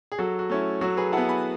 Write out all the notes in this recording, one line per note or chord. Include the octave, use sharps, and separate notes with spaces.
G#4
F#3 F#4 A4
F#4
A3 C#4 E4
F#3 F#4 A4
G#4 B4
B3 E4 F#5 A5
G#5 B5